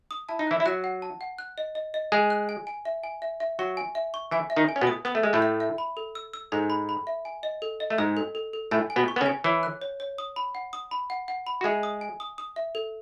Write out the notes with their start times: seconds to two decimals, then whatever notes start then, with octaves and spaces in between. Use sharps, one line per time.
0.11 D#6
0.29 E4 A5
0.39 D#4
0.47 E3 E4 F#6
0.60 E4
0.66 F#3 F#4 F#6
0.84 F#5
1.02 A5
1.21 F#5
1.38 F#6
1.58 D#5
1.75 D#5
1.94 D#5
2.12 G#3 G#4 G#5
2.30 F#6
2.49 G#5
2.67 G#5
2.85 E5
3.04 G#5
3.22 E5
3.40 E5
3.59 F#3 F#4 C#6
3.77 G#5
3.95 E5
4.14 C#6
4.31 E3 E4 G#5
4.50 E5
4.56 D#3 D#4
4.69 G#5
4.76 C#4
4.81 B2 B3
4.87 D#6
5.05 B3 D#6
5.15 A3
5.23 G#3 E5
5.33 A2 A3
5.42 E5
5.60 E5
5.78 B5
5.97 A4
6.15 E6
6.34 E6
6.52 G#2 G#3 A4
6.70 B5
6.89 B5
7.07 E5
7.25 G#5
7.43 D#5
7.62 A4
7.80 D#5
7.90 A3
7.98 G#2 G#3 D#5
8.17 A4
8.35 A4
8.53 A4
8.71 A2 A3 G#5
8.90 G#5
8.96 B2 B3
9.08 C#6
9.16 B3
9.21 C#3 C#4
9.26 G#5
9.44 E3 E4 C#5
9.63 F#6
9.82 C#5
10.00 C#5
10.18 D#6
10.36 B5
10.55 F#5
10.73 D#6
10.91 B5
11.10 F#5
11.28 F#5
11.47 B5
11.61 F#4
11.64 G#3 G#4 E5
11.83 D#6
12.01 G#5
12.20 D#6
12.38 D#6
12.56 E5
12.75 A4